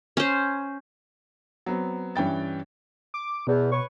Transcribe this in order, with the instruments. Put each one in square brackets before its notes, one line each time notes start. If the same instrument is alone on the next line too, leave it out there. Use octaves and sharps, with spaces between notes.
[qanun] C#4 C5
[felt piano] F#3 B3 C4
G2 E3 C#4 G5 A6
[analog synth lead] D6
[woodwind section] E2 [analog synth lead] B2
[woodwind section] B4 C#5 C#6